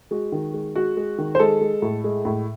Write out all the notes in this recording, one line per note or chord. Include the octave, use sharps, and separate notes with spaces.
G#3 F#4
D#3
G#3
G#3 F#4
G#3
D#3
C5
G#3 A4
G#3
A2
G#3
A2